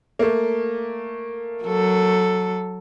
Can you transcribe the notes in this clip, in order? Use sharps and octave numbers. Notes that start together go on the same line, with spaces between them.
A3 A#3
F#3 A4